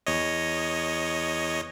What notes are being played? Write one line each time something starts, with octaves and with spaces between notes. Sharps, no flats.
E2 C#5 D#5